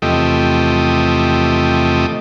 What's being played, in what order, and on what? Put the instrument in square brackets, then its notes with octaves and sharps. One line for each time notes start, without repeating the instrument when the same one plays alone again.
[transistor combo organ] E2 C3 F3 A3 G4 D#5